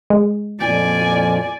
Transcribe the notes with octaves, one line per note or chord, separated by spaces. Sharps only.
G#3
F2 A#2 D5 G#5